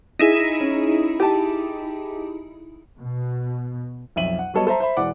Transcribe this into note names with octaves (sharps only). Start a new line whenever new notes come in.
D#4 E4 G#4
C#4
G4 A5
B2
B1 F2 E5 D#7 F#7
F#5
F#3 G3 B3 A4 C#5 D#5
A4 C5 E5 A#5
C5 E5 B5
E1 E3 D5 F#5 D6